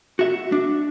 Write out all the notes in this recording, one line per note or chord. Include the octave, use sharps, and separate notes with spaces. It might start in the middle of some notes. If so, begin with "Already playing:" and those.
F#4 E5
D4